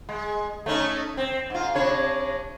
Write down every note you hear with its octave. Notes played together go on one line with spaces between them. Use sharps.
G#3
A3 C#4 D#4
C4
G#2 F4
C3 D4 C#5